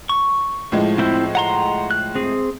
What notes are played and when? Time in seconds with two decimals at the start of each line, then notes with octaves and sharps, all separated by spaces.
0.09 C#6
0.72 A2 F3 G#3
0.98 C4 E4 C5
1.35 F#5 A#5 C6
1.91 F#6
2.15 C4 G#4